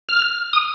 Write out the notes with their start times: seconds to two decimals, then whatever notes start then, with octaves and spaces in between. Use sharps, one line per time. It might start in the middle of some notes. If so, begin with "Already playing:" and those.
0.09 F6
0.53 D#6